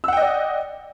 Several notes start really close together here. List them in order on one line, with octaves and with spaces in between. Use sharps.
E6 F#5 G5 D#5 D5